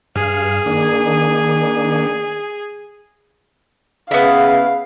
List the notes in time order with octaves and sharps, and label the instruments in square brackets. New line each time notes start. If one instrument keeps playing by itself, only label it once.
[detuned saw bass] G2 [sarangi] G#4 [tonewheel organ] F5
[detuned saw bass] D#3 [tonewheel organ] A#3 D4
[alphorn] C#3 [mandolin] B3 E4 [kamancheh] F5